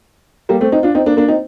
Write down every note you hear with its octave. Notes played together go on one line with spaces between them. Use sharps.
G3 A#3
A3 C4
C4 D#4
D4 F4
C4 D#4
A#3 D4
A#3 D4
C4 D#4